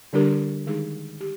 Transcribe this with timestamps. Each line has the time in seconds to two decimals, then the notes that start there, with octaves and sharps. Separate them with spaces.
0.13 D3 G3 D4 G4 A#4
0.67 D#3 G#3 D#4 G#4
1.21 G4